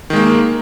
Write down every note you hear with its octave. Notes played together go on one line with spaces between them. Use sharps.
D#3 G#3 A#3